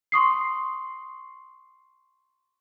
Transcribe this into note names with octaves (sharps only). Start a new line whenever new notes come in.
C6 C#6 D#6 C7